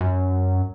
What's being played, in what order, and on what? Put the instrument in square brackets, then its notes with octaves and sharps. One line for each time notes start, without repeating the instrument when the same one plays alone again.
[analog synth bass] F#2